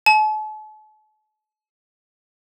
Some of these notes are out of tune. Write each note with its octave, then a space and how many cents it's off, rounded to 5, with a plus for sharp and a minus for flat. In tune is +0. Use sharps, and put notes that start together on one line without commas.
A5 -40